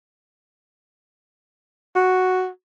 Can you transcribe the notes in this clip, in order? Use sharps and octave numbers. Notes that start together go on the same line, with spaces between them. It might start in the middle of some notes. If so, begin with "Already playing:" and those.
F#4